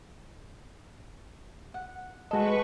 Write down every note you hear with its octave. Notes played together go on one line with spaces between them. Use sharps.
F#5
G#3 F#4 A4 B4 D#5 C#6